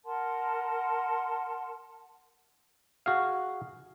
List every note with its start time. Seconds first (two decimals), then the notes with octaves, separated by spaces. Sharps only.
0.04 A#4 F#5 A5 C6
3.06 F#4 G#4 F5